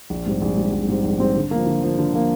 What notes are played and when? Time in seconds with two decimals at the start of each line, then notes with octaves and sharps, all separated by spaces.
0.10 A#1
0.26 G#2 G3 C4
0.42 A#1
0.57 G#2 G3 C4
0.73 A#1
0.88 G#2 G3 C4
1.04 A#1
1.19 G#2 G3 C4
1.36 D3
1.51 F3 A#3
1.67 D3
1.83 F3 A#3
1.98 D3
2.14 F3 A#3